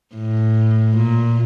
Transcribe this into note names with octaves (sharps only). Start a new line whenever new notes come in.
A2
A#2